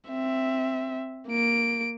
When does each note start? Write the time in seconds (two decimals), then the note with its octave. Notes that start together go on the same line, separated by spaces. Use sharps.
0.10 C4 E5
1.28 A#3 D7